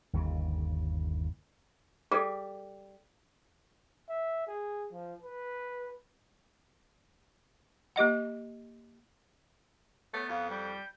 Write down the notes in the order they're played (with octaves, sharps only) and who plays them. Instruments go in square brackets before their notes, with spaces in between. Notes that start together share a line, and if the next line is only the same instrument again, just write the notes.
[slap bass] G1 D#2 C#3
[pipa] G3 [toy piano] G#4 A4
[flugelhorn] E5
G#4
F3
B4
[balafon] A#3 G4 D#5 F#5
[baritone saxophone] A3 [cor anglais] B3 [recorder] C#5
[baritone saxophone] F2 [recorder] F5
[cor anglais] G3 [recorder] G6